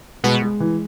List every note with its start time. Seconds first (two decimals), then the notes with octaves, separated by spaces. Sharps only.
0.24 B2 G#3 B3
0.42 G#3
0.60 E3